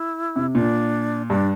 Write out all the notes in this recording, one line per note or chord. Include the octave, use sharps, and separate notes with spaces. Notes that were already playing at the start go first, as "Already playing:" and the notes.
Already playing: E4
C3
A#2 D4
G2 D4